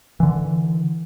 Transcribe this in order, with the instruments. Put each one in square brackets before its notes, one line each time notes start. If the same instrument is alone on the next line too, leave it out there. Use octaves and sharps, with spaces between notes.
[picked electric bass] D3 E3